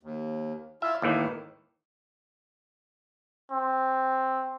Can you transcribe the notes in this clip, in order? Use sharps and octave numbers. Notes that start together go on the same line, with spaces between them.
D#2
E4 F4 E5
D#2 A2 D#3 E3
C4